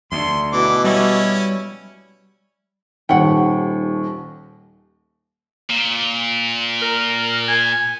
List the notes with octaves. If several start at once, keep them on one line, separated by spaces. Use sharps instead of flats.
D2 C6
B2 E3 D6
G3 C#4 E4
D#1 D#2 F#5 G5
A#2
A#4
G#5